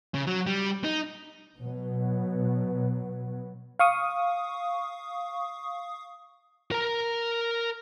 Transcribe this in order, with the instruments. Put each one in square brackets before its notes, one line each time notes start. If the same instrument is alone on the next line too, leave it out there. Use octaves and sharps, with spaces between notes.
[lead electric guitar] C#3
F#3
G3
D#4
[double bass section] B2 F#3 B3
[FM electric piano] F5 C#6 D#6
[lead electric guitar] A#4 A#5